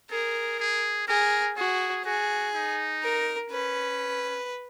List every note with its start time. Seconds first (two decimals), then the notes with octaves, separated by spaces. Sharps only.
0.11 G#4 A#4
0.59 G#4
1.08 G#4 A#4
1.57 F#4 G#4
2.05 F#4 G#4
2.54 D#4
3.03 A#4
3.50 C#4 B4